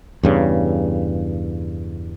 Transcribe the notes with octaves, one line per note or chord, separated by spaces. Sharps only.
E2 G2 C#3